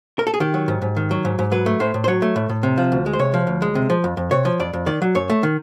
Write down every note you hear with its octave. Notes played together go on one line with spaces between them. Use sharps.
A#4
A4
G#4
D#3 G4
F#3
G#2
G#2
D#3
F#3
G#2
G#2
F#3 B4
A3
A2 C5
A2
C5
F#3 C#5
A3
A2
A2
C3
F3
D2
G#3
C5
C3 C#5
F3
D2
G#3
C3
F3
F2
F2
C3 C#5
F3
F2 D5
F2
D#3 D5
F#3
F#2 C#5
A3
D#3